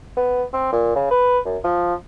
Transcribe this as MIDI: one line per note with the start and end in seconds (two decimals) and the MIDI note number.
0.17 0.44 59
0.53 0.72 60
0.72 0.95 46
0.95 1.07 49
1.11 1.39 71
1.46 1.57 42
1.64 1.94 53